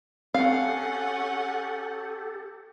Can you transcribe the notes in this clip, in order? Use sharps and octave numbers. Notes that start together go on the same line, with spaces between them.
C4 C#4 G4 A4 F5 F#5